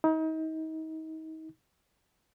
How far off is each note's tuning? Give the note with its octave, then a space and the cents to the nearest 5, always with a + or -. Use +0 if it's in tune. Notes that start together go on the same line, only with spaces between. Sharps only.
D#4 +35